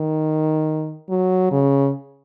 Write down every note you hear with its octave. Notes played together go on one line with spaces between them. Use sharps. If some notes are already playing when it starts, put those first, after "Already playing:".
Already playing: D#3
F#3
C#3